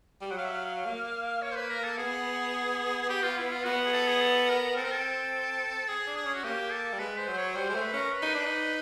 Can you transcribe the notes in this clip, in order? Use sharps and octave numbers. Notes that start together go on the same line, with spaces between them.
G3
F#3 F#5
F5
E5
F5
A#3
C#5
C5
B4
A#4
A4
B3 G#4
G#4
G4
F4
E4
F4
B3 F#4
G#4
A4
G#4
A4
A#4
C4 A4
A#4
A4
G#4
D4
G#4
C#4
F#4
A#3 G4
A4
G3
G#3 B4
C5
F#3
C5
C#5
G3 C5
G#3 C5
A3
B4
C#4 A#4
B4
D#4
D4
D#4